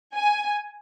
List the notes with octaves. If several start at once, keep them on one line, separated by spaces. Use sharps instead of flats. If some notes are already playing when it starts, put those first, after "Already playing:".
G#5